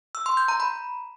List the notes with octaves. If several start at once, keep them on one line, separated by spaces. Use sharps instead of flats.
E6
C6
G6
A#5
B5